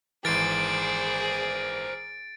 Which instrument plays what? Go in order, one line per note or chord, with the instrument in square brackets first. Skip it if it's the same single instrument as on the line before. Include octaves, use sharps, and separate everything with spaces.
[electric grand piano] G#1 E3 [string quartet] G#4 D6 [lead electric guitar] A#4 C5 [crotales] A6 D7